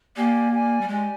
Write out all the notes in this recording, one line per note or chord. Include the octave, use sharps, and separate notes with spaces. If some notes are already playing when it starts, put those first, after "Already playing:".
A#3 G4 D5 G#5
G4 D5 G#5
G3
G#3 G4 D5 G#5